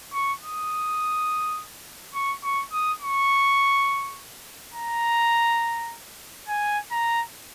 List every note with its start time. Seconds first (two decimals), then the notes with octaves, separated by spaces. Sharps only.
0.13 C#6
0.41 D#6
2.14 C#6
2.43 C#6
2.72 D#6
3.01 C#6
4.74 A#5
6.48 G#5
6.92 A#5